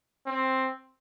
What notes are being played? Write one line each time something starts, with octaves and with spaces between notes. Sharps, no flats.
C4